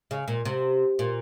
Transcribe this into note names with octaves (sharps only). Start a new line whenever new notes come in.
C#3
A#2
C3
A#2